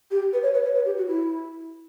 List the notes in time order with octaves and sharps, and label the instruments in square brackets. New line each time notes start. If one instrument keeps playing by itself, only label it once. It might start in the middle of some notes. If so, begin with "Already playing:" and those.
[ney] G4
B4
C#5
B4
C#5
B4
G4
F#4
E4